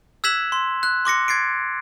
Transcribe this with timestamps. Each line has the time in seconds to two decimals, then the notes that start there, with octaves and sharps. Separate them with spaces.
0.24 E6 F#6 G#6 B6 E7 F#7
0.52 C6
0.83 F#6
1.05 C6 D6 A#6 C#7
1.28 G#6 A6 C7 D7